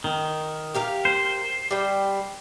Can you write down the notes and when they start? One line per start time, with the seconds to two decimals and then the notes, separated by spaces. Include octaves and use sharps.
0.04 D#3
0.74 G4 A#4 F5
1.05 C5
1.71 G3 G5